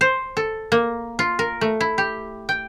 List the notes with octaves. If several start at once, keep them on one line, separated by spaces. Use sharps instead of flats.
C5
A4
A#3
F4
A#4
A3
E4
G4
G5